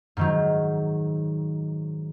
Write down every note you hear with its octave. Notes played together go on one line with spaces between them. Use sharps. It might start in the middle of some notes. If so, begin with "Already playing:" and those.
G#2 D#3 F#3